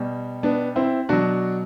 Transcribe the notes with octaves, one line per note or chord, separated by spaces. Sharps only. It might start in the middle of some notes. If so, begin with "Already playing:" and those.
Already playing: B2 G3
B3 D4
C4 E4
B2 F#3 D4 F#4